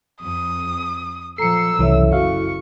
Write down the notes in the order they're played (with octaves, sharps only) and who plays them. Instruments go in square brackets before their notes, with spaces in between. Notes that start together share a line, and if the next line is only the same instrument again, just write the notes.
[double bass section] F2 [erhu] D#6
[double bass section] A#2 F3 [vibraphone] A4 A#5 [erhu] E6 [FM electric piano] C7 C#7
[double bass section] F#1 [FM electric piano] C2 E3 [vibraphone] A4 C#5 E5
[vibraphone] E4 F#4 A4 [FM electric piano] F5 [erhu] C#6